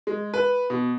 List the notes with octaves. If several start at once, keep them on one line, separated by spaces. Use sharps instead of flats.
G#3
B4
B2